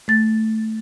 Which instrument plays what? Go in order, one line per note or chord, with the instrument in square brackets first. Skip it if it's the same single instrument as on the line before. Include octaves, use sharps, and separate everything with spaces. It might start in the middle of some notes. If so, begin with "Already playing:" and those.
[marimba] A3 A6